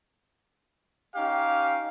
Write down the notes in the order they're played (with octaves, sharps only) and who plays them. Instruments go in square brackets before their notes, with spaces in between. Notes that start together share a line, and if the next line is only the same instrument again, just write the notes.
[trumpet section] C#4 D#4 G4 F5